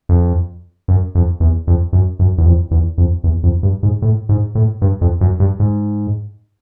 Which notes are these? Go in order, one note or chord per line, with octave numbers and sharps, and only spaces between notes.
F2
F#2
F2
E2
F2
F#2
F#2
E2
F2
E2
F2
E2
F2
G2
G#2
A2
G#2
A2
G2
F2
F#2
G2
G#2